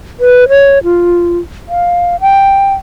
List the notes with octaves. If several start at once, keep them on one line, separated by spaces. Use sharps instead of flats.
B4
C#5
F4
F5
G5